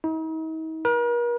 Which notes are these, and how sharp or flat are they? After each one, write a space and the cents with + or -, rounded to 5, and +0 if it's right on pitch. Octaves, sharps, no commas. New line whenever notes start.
D#4 +45
A#4 +45